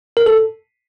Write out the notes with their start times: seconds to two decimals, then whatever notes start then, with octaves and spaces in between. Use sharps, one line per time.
0.17 A#4
0.26 A4